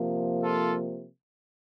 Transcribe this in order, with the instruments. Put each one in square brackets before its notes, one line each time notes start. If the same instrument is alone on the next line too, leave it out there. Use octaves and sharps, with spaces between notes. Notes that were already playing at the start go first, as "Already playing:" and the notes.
Already playing: [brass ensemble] C3 F3 A#3
F4 A4